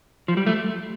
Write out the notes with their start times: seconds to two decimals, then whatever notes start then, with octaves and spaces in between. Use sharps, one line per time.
0.28 F3
0.37 G3
0.47 A3